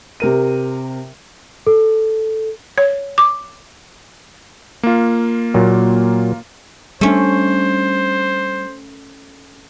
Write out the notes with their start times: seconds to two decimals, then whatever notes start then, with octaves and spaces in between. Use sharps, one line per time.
0.20 C3 A#4 D#7
1.67 A4
2.78 C#5
3.18 D6
4.83 A#3 F4
5.54 A#2 F#3
7.01 G3 A3 C#4 D4 C5